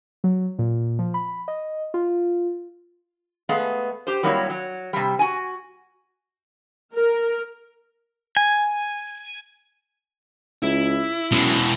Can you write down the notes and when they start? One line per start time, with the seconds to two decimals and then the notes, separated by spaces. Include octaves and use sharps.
0.24 F#3
0.59 A#2
0.99 F3
1.14 B5
1.48 D#5
1.94 F4
3.49 G#3 A3 B3 G#4 F5
4.07 G4 C5
4.23 F#3 G3 A#3 C4 E4 C#5
4.50 F#3
4.93 C3 G3
5.19 F#4 G#5
6.93 A#4
8.37 G#5
10.63 C#2 E4
11.32 F#2 B2 G#3